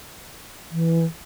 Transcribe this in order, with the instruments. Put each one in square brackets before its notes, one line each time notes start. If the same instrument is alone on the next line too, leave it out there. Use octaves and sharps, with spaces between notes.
[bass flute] E3